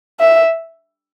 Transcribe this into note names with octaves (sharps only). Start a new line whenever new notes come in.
E5